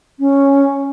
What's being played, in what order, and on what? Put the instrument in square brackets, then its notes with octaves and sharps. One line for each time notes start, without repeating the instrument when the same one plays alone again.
[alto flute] C#4